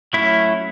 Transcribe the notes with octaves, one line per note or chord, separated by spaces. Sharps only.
F#3 A3 C#4 E4